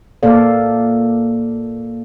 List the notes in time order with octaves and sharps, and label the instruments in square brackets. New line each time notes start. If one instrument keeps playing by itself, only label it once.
[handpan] A#2 A3 A#3 A4 D5 F5